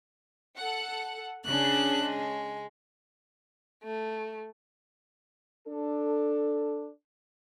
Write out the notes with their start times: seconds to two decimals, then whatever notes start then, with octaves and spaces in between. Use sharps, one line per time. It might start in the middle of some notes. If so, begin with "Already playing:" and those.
0.58 A4 F#5
1.47 C#3 D4 G#4 F#6
2.02 G#3
3.83 A3
5.67 D4 A4